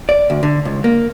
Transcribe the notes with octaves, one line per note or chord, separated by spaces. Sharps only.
D5
D2
D3
C#2
A#3